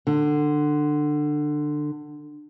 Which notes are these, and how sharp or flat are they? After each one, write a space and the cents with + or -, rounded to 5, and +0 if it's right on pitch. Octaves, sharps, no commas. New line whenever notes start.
D3 +20